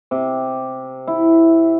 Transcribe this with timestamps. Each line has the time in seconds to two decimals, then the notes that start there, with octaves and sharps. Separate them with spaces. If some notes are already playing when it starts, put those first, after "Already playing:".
0.11 C3
1.07 E4